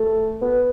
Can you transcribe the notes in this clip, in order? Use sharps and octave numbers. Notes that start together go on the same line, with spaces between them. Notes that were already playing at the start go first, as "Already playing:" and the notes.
Already playing: A3
B3